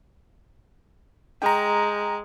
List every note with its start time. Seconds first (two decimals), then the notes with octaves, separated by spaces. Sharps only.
1.42 G#3 G5 A#5